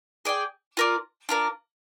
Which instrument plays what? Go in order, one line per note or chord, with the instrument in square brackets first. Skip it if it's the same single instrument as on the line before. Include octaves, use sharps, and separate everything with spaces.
[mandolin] G#4 D5 G5
F4 A#4 D5
D4 F4 A#4